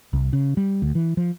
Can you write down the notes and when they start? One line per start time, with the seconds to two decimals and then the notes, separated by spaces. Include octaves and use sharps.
0.13 C2
0.33 C#3
0.57 G3
0.82 D2
0.95 E3
1.17 F3